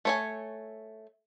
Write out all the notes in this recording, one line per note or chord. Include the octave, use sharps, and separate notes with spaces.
A3 C#5 G#5